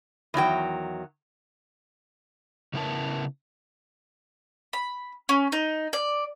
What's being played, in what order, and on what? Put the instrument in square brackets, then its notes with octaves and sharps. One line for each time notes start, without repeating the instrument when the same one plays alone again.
[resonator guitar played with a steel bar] E2 D#3 F#3 G5
[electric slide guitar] C#3 B3 E4 A#4 A5
[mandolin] B5
C#4
D#4
D5